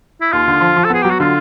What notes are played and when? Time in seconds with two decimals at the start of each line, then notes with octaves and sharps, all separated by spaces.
0.21 E4
0.32 D#2 F4
0.48 D3
0.61 F3
0.77 F3
0.85 A4
0.90 B3 G#4
1.02 F#3 G4
1.11 F#4
1.20 D3 F4